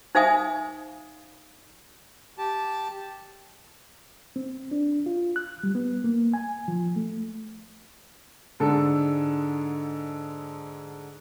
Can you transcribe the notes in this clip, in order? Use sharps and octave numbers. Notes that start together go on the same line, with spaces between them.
D#4 C5 E5 F5 G#5 D#6
G4 A5
C4
D4
F4
F#6
G3
B3
A#3
G#5
F3
A3
G#2 D3 G#3 A4